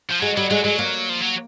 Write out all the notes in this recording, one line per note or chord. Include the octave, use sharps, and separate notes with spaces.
F3
F#3 G#3
F#3 G3
F#3 G#3
F#3 G#3
A#3
F3
F#3